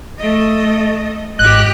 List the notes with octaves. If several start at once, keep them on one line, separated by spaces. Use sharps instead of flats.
A3 D#5
G#1 E2 G4 D#5 F#6